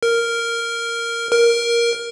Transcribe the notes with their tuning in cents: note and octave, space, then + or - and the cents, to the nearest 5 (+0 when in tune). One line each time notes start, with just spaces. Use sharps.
A#4 -5
A#4 +10